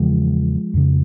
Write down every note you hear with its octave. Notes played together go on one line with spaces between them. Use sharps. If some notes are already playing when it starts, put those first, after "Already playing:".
Already playing: E2 C#3 F3 G#3
F2 C#3